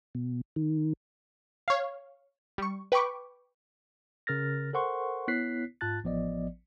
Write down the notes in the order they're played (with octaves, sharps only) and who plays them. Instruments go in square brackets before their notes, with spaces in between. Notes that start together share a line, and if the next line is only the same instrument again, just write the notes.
[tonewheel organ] B2
D#3
[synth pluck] C#5 F5
G3 C#6
B4 G5 B5 C#6 D6
[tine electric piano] C#3 A#4 F6 A6 A#6
A4 A#4 C5 F#5 C6 C#6
B3 E4 C#5 F#6 B6 C7
G#2 F4 A5 F#6 A6
A1 F3 B3 D5 D#5